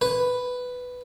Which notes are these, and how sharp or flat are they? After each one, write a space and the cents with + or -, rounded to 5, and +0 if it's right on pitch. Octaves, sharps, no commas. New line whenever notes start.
B4 +5